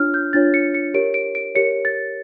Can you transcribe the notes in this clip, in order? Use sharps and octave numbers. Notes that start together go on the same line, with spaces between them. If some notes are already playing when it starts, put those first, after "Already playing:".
Already playing: D4 F4 C#5 F6
G6
D4 F4 C#5 A6
C#7
C#7
G4 A#4 C#5 D7
D7
D7
G4 A#4 C#5 C#7
A6